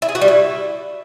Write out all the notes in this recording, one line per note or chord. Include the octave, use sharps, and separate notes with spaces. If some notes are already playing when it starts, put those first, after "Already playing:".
E4
G#4
F#4
G3
E4